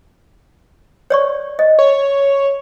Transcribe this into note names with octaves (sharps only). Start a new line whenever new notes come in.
C#5 D5 C#6
D#5
C#5